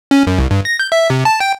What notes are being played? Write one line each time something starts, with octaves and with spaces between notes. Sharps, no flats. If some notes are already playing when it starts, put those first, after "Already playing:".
C#4
F#2
C2
G2
A#6
G6
E5
C3
A5
G5